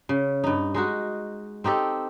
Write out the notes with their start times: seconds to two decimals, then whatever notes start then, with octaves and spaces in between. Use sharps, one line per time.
0.09 C#3
0.44 G2 D#4
0.74 G#3 D#4 F#4
1.64 C4 D#4 G4 A4